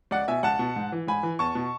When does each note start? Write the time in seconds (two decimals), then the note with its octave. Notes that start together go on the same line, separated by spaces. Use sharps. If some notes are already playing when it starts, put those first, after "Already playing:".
0.11 C#2 D5 F#5
0.28 B2 E5 G#5
0.43 C#2 F#5 A5
0.59 B2
0.76 G#2
0.92 E3
1.07 G#2 G#5 B5
1.23 E3
1.39 E2 A5 C#6
1.55 B2